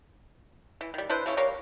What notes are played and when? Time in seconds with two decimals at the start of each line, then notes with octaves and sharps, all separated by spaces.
0.81 E3
0.94 D#3 G3
1.09 D4 E4 B4 C5
1.26 C#3 E3 A3 C#4
1.37 G3 A#4 C#5 F5